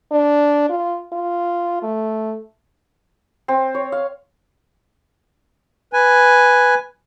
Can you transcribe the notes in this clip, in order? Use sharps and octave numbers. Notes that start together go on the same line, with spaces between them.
D4
F4
F4
A3
C4
C#5
F5
B4 G#5